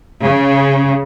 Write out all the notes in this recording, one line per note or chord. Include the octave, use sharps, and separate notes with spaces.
C#3